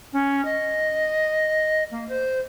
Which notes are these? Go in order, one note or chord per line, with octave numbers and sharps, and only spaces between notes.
C#4
D#5
A#3
C5